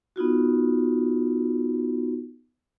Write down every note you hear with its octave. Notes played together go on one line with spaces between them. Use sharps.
B3 D#4 F4 F#4